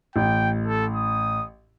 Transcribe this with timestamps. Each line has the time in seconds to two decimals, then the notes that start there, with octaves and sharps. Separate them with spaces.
0.16 A1 G5
0.67 A4
0.95 D#6